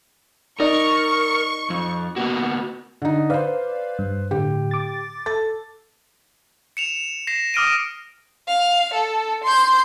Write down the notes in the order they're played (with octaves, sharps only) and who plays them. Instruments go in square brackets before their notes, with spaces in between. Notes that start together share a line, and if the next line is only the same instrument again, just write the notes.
[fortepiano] D#4 D5 [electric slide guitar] A#4 [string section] C#6
[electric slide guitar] F2
A#3 B3 F#4
[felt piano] D3 D#4
[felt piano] B4 C5 [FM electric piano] D5 F5
[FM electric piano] G2
[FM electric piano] A2 D3 [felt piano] G4
[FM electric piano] D6 A6
[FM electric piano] A4 [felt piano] A6
[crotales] C#7 E7 F7
A#6 C7 E7
D6 D#6 F6 A#6 D7 D#7
[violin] F5
A4
C6 G6